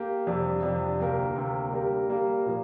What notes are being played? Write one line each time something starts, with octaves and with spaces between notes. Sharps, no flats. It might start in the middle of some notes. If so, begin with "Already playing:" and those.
Already playing: A#3 G4
F2 C3 G3 D4
F2 C3 G3 D4
D2 C3 A#3 G4 A#4
D2 C3 A#3 G4 A#4
G3 A#3 G4 A#4
G3 A#3 G4 A#4
A#2 F3 A#3